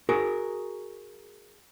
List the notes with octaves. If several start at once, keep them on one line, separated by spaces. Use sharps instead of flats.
F#4 G#4 A#4